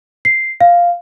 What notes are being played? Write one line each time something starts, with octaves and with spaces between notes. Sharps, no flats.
C7
F5